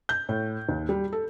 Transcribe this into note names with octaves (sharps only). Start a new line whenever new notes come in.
G6
A2
D#2
G3
A4